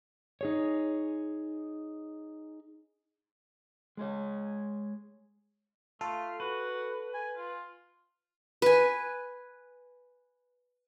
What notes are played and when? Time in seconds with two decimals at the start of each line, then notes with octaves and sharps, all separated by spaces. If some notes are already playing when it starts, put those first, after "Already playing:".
0.41 D#4 G#4 C#5
3.97 G#3 G#4 C#5
6.01 A3 F4 A4
6.40 F#4 B4
7.14 G#5
7.37 F4
8.62 B4 G#5